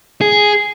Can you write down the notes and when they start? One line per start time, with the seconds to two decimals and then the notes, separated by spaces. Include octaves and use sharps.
0.21 G#4